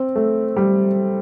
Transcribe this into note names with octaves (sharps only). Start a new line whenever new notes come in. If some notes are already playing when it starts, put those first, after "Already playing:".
Already playing: C4
A3
G3